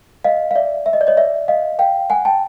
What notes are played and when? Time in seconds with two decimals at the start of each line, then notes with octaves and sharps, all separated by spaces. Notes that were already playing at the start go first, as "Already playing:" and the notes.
0.24 D#5 F5
0.51 F5
0.55 D5 E5
0.86 E5
0.93 D#5
1.01 D5
1.07 C#5 D#5
1.17 D5 E5
1.48 D#5 F5
1.79 F5 G5
2.10 F#5 G#5
2.25 G5 A5